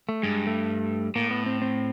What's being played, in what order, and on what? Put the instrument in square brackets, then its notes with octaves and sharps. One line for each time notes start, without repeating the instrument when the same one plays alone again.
[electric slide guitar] A3
[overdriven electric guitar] G2 [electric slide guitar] G#3
[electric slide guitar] A3
[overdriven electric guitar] A2 [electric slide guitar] A#3
[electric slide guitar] B3
C4
C4